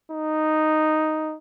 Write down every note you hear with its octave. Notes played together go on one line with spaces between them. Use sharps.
D#4